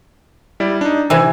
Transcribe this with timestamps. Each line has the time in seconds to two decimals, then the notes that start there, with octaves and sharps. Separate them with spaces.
0.60 G3 E4 D5
0.81 D4 D#4
1.10 C3 E3 E6 G#6